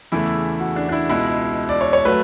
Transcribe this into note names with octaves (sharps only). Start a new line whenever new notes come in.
E2 C#3 E3 A3 E4
F#4
D4
D4
E4
C#2 B2 G#3 E4
D5
C#5
C#5
F#3 A3 B4